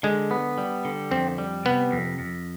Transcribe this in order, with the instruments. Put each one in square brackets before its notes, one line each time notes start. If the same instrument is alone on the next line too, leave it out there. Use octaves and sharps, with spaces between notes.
[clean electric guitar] D3 [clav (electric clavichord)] G#3
[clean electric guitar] B3
G3
D3
[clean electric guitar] F2 [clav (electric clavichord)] C4
[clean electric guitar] G3
[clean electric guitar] C3 [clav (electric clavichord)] B3
[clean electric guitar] F2
F2